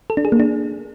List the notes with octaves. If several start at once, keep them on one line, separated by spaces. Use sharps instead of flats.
A4
D4
G#4
A#3
D4